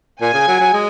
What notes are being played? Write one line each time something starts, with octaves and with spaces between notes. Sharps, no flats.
A#2 G#5
C#3
F#3
F#3
G#3